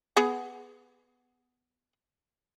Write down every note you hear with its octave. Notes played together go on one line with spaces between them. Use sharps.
B3 G#4 F#5